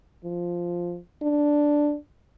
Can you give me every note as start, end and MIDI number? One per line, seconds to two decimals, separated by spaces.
0.24 0.98 53
1.23 1.96 62